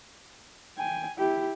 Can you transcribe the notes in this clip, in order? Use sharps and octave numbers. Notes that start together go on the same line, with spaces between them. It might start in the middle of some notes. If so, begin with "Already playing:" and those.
G5 G#5
E4 G4